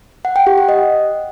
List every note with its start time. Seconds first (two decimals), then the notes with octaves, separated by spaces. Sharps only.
0.25 F#5
0.36 G5
0.47 G4
0.58 F#5
0.69 D#5